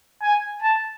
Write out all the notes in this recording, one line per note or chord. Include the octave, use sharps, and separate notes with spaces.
G#5
A5